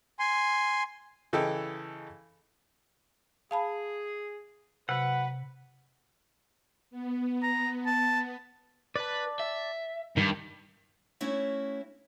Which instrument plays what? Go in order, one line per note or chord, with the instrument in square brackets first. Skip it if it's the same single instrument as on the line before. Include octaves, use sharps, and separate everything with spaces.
[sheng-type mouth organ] G#5 C6
[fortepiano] C#3 E3 A4 D#5 G5
[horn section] G#4 [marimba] F5 A5 B5
[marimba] C3 [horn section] F#3 B4 [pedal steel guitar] F#5
[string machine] B3
[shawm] A#5
A5
[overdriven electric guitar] B4 [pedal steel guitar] D5 A5
[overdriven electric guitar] E5
[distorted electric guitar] G2 [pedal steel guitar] D#3 G5
[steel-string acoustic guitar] A3 C#4 E4 F#4 C#5 E5